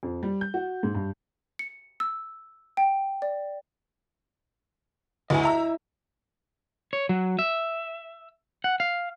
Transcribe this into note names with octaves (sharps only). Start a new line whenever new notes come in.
F2
G3
G6
F#4
G#2
G2
C#7
E6
G5
D5
D2 E4 B4 D#5 G#5
E5 A#5 E6
C#5
F#3
E5
F#5
F5